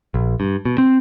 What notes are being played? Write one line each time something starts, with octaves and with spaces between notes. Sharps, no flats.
A#1
G2
B2
C4